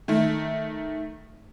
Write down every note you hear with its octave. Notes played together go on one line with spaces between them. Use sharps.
D#3 A3